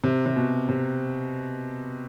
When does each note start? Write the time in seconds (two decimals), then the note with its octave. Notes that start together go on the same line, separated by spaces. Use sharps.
0.04 C3
0.26 C3
0.36 B2
0.69 C3